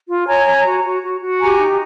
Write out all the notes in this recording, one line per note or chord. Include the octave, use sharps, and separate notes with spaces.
F4
C#5 G#5 A#5
C#5
F#4
F#4
F#4
F#4
G4 G#5 A#5
D#4